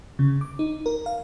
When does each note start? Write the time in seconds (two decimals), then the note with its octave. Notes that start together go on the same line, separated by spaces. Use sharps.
0.19 C#3
0.41 D6
0.59 D#4
0.86 A#4
1.06 F5